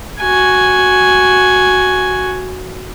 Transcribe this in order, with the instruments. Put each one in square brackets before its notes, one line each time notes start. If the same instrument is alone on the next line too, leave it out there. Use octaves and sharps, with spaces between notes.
[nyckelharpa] F#4 G#5